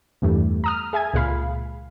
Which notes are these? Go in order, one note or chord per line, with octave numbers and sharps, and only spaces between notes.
E2 G2 E3 G3 A3
A#5 D#6 F6
G#4 E5 G#5 G#6
C#2 A#2 G#4 F5 B5